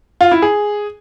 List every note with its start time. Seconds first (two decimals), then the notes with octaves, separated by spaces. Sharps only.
0.21 F4
0.31 E4
0.42 G#4